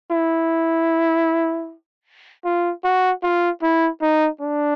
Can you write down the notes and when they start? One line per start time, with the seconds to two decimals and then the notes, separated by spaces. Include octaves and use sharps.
0.11 E4
2.45 F4
2.84 F#4
3.23 F4
3.62 E4
4.01 D#4
4.41 D4